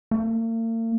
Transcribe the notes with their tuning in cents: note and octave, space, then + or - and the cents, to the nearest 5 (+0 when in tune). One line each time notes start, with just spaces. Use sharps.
A#3 -45